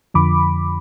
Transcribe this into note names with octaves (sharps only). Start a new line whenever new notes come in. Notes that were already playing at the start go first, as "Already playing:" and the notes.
F2 D3 F3 B5 D6